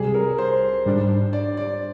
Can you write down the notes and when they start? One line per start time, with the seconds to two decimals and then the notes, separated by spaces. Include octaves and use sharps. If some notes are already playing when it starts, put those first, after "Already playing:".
Already playing: C2 C3 G3 G#4
0.14 A#4
0.38 C5
0.86 G#2 G3 D4
1.33 D5
1.57 D5